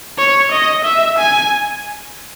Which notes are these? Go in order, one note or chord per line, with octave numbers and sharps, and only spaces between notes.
C#5
D#5
E5
G#5